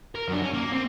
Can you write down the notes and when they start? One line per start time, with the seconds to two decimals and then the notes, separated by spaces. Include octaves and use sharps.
0.15 A#4
0.28 F#2 D4
0.42 C#4
0.53 A#3
0.73 C4